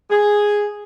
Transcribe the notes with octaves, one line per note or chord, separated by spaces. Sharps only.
G#4